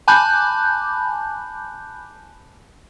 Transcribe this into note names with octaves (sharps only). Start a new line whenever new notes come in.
G#5 A5 B5 D6 F#6 G6